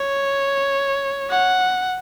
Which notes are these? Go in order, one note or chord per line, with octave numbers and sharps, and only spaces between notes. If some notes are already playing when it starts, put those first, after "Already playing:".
Already playing: C#5
F#5